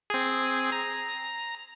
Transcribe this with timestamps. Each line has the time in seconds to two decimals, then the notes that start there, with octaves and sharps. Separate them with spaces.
0.10 C4 G#4
0.72 A#5